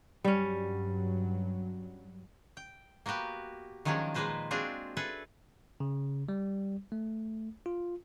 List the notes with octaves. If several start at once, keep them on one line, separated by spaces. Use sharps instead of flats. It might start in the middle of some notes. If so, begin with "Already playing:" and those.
G2 F#3 G3 C#4
G5
A#3 B3 F#4 G4 B4
D#3 F3 F#3 G#3 C#4 D4
A#2 G#3 A#3 B4 C5 D#5
G#3 C4 D4 F4 F#4 G#4
G#4 A4 B4 E5
C#3
G3
A3
F4